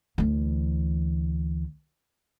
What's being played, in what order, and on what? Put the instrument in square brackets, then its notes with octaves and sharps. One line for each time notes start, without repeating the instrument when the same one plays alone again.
[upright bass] D2 E3